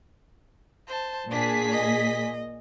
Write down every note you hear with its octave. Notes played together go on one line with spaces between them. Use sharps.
C5 A5
A#2 D4 G#4 B6
D#5